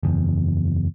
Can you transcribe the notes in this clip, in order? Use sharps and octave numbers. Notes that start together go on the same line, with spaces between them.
F#1 E2